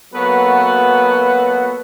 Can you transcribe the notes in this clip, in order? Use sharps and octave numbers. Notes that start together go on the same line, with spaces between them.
F#3 A#3 B3 F#4 A4 B4